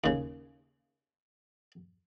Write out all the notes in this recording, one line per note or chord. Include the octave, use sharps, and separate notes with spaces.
D#2 C#3